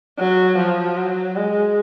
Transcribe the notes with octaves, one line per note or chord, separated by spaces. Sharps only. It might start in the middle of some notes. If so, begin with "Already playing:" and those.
F#3
F3
F#3
G#3